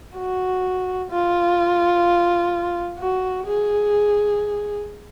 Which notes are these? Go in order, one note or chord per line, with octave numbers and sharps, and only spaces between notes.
F#4
F4
F#4
G#4